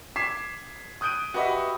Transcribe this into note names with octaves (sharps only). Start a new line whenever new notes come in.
D6 G#6 B6 C7 E7
D#6 F#6 G6 D7 D#7
F#4 G4 B4 D#5 E5 F#5